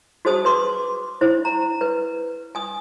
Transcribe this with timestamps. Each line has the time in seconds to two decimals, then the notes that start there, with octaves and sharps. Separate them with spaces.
0.25 F#4 G#4 C5 A5 D#6
0.45 B4 C6 D6
1.21 E4 C5
1.45 A#5
1.81 B4
2.55 G#5 D#6